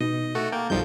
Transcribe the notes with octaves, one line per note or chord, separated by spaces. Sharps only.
B2 D#4 D#5
A3 F#4 A4
A#3 G5
B1 F#2 F3 G3 D#4 G6